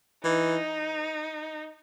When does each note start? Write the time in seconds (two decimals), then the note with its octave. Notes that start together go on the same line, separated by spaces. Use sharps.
0.24 E3 D#4